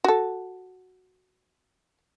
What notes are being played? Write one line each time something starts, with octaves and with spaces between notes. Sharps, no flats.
F#4 A4